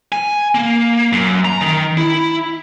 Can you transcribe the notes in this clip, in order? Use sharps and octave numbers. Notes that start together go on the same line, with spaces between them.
G#5
A#3
F#2
A#5
D#3
E4